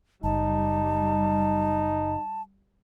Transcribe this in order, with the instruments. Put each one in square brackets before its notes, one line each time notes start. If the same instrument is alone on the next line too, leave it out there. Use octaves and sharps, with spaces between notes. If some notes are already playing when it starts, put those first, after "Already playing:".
[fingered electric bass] F#1 [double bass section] G3 [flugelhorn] D#4 [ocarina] A5